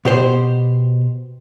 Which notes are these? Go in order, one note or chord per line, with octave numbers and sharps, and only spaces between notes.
B2 G4 C5